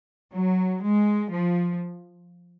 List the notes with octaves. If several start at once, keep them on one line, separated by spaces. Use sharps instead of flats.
F#3
G#3
F3